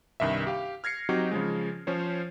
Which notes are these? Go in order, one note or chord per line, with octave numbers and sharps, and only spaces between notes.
C2 G2 D#3 E5
G4 F5
F6 G#6 A#6 C7 C#7
F#3 C4 D#4 F#4 G4
C#3 F3 G#3
F3 C#4 C5 C#5